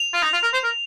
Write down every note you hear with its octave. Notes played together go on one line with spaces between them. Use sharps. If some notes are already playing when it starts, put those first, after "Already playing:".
Already playing: F7
F4
D#4
F4
A#4
C5
A#4